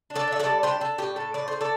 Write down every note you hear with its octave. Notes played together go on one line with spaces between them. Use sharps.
D4
A4 D5
D4 E5
A4 D5
G3
D4 G4 C5
D4 A4
A2 G4
A2 A4
A2 D5
A2 C5
A4 D5